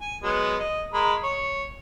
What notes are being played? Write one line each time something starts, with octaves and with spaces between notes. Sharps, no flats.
G#5
F#3 G#3 B3
D#5
G#3 A#4 B5
C#5